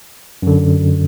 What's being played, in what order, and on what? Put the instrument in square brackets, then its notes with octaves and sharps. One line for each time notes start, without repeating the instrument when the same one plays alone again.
[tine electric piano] F#2 D3